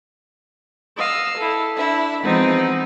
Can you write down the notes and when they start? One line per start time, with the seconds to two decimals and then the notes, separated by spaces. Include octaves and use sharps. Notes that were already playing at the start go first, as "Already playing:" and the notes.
0.97 D#5 F5 E6
1.37 E4 A4
1.76 D4 E4 E5
2.22 E3 F3 G#3 B3 C4 D#4